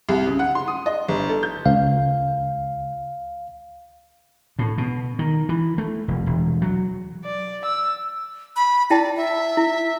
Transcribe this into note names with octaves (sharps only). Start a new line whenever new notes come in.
C2
C#3
F#5
C6
D#6
D#5
G1
A4
G6
C#2 F5
A2
B2
D#3
E3
A3
F1
E1
F#3
D5
E6
B5
E4 D5 G5 A5
E5
E4